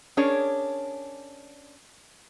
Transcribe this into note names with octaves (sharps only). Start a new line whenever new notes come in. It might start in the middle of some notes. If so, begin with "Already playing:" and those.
C#4 D4 G#4 A#4 C#5